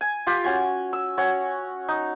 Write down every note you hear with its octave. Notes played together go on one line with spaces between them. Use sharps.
G#5
F4 G4
C#4 F#4 G#5
E6
C#4 F#4 C#5
D#4